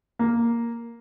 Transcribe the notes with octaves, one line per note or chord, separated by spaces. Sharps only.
A#3